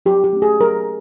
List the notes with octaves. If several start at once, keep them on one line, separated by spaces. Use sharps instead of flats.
F#3 G4
G4
A3 C#4
G#4
F#3 A#4